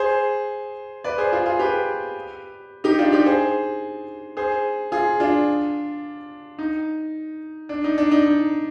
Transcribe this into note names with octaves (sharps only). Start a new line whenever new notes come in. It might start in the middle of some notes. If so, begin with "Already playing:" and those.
Already playing: G#4 C5
B4 D5
G#4 C5
F4 G#4
F4 G#4
G4 B4
D#4 G4
D4 F4
D#4 G4
G#4 C5
G#4 C5
F4 G#4
D4 F4
D#4
D4
D#4
D4
D#4
D#4